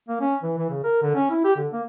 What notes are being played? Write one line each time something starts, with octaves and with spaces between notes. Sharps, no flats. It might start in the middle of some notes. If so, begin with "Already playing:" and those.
A#3
C#4
E3
E3
C#3
A#4
D3
C#4
E4
G4
D3
A#3